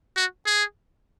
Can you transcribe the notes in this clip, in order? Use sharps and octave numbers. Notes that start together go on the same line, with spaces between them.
F#4
G#4